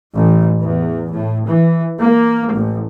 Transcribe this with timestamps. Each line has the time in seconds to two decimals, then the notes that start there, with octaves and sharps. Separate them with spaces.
0.14 A1
0.61 E2
1.13 A2
1.48 E3
2.01 A#3
2.53 A1